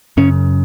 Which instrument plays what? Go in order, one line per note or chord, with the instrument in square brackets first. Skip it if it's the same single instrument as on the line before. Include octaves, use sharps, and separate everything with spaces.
[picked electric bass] F#2 C#3 C#4